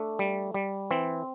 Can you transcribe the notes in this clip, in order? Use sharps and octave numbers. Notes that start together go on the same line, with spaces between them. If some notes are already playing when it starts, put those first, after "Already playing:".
Already playing: A3 D4
G3
G3
E3 C4